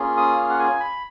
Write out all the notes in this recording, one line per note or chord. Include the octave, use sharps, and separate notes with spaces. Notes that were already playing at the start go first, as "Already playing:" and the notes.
Already playing: A#3 C#4 F4 G#4
D#6
F6
F#5
G#5
B5